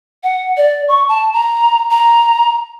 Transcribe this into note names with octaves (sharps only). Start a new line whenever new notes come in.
F#5
D5
C#6
A5
A#5
A#5